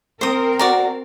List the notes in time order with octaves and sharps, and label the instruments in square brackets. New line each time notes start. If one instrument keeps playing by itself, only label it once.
[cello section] C4 A#4 [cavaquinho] C5 D#6
[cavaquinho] F#4 D5 A#5